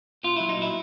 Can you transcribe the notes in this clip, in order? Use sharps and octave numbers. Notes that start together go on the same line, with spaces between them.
A#2 F4
F#3 E4
D#4
A#2 E4